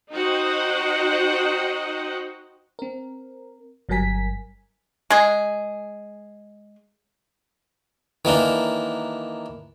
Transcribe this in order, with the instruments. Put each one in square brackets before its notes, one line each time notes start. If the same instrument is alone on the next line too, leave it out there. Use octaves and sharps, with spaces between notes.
[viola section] D#4 F#4 C5 D#5 F#5 G5
[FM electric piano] C4 A#4
G1 F#3 G3 A#4 G#5 B6
[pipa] G#3 G#4
[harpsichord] D#3 E3 A#3 D4